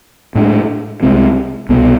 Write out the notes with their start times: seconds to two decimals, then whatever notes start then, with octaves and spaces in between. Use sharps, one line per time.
0.35 A2 G#3 D4
1.02 C2 C3 G#3 C4
1.69 C2 B2 B3